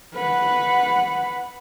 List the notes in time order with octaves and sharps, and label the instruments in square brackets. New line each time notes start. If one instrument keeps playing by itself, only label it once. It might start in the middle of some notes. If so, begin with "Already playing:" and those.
[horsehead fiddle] B4 F#5